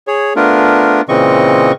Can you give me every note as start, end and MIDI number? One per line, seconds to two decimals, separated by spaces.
0.07 0.33 68
0.07 0.33 73
0.36 1.01 57
0.36 1.01 59
0.36 1.01 62
0.36 1.01 65
0.36 1.01 70
1.09 1.72 46
1.09 1.72 49
1.09 1.72 52
1.09 1.72 60
1.09 1.72 75
1.09 1.72 85